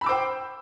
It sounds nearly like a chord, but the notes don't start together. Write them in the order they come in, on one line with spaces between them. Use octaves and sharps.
B5 E6 D6 C5 G5